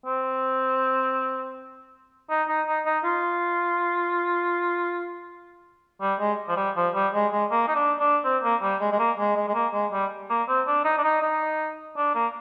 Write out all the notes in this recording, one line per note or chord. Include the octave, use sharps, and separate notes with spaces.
C4
D#4
D#4
D#4
D#4
F4
G3
G#3
F3
G3
F3
G3
G#3
G#3
A#3
D#4
D4
D4
C4
A#3
G3
G#3
G#3
A#3
G#3
G#3
G#3
A#3
G#3
G3
A#3
C4
D4
D#4
D4
D#4
D#4
D4
A#3